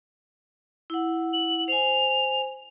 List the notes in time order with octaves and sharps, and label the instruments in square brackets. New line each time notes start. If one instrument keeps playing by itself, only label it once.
[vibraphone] E4 F#5
[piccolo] F#7
[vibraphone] C5 G#5 [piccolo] F7